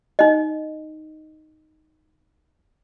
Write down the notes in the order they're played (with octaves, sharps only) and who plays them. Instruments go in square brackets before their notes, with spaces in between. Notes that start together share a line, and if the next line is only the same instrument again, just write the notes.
[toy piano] D#4 D#5